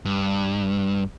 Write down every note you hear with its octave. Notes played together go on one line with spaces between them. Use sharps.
G2